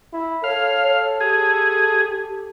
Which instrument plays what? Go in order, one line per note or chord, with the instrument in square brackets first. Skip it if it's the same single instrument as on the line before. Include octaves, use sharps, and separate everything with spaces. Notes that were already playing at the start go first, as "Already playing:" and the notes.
[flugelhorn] E4
[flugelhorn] A4 [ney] C#5 [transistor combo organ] F5
[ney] C#5
[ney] G4 [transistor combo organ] G#4